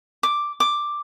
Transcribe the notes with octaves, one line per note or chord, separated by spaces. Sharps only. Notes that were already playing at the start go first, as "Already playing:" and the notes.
D6
D6